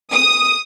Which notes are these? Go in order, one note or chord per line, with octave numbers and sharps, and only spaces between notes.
D#6